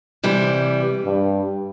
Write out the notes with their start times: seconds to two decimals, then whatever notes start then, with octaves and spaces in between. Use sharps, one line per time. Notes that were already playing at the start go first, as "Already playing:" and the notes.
0.23 C3 E3 G3
1.05 G2